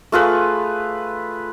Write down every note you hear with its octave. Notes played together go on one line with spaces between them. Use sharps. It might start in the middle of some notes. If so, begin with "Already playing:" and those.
A3 F4 G#4 B4